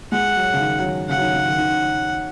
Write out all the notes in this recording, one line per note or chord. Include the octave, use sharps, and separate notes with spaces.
G#3 F#5
F#3
C#3
D#3
F#3
D#3
C#3 F#5
F#3
D#3
C#3
D#3
D#3